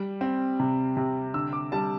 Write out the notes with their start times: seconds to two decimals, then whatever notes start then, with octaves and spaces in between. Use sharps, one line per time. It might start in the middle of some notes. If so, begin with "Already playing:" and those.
Already playing: G3
0.21 C4
0.60 C3
0.97 C3
1.34 D3 E6
1.53 D6
1.72 G3 A5